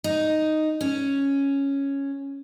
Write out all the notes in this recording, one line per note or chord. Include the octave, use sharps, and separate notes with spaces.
D#4
C#4